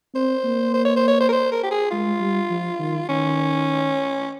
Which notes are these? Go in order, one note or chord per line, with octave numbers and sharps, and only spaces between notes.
C4 C5
A#3
C5
C#5
C5
C#5
C5
A#4
C5
A#4
G4
G#4
G#3 F4
G3
F3
D#3
D#3 C#4